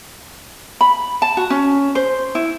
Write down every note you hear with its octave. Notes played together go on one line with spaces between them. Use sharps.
B5
A5
F#4
C#4
C5
E4